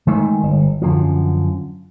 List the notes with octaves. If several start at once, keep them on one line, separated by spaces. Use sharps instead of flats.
D#3 G#3 A3
G1
F#2 D3 F3